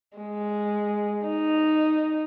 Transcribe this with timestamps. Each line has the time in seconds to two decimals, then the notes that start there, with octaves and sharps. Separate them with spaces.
0.18 G#3
1.26 D#4